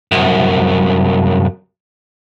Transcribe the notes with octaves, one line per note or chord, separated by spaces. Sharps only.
C2 F#2